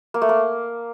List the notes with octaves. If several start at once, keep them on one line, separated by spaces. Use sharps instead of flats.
A#3
A3
A#3